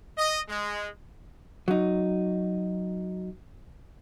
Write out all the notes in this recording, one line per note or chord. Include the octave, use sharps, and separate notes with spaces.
D#5
G#3
F#3 D#4